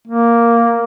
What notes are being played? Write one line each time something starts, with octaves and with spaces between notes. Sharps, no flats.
A#3